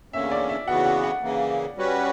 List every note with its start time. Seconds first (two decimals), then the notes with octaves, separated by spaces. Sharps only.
0.13 E2 D3 A#3 C#4 E5
0.31 D5
0.49 E5
0.68 C#3 E3 B3 F#4 F#5
0.86 F#5
1.04 F#5
1.22 C#3 E3 A#3
1.77 G3 C#4 F#4 B4